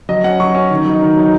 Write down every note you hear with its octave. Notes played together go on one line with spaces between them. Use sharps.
F#3 D#5
C#4 F#5
F#3 C#6
C#4
D#3
F#3 D#4
D#3
F#3 D#4